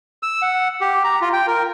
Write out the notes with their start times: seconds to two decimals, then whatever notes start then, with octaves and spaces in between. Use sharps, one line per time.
0.23 E6
0.42 F#5
0.81 G4
1.04 A#5
1.22 F4
1.33 G5
1.48 A#4